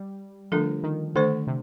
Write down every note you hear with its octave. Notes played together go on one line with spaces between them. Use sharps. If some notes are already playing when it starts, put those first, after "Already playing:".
Already playing: G3
D3 F3 A3 D4 A4
D#3
D3 D#3 A3 D4 A4 C5
C3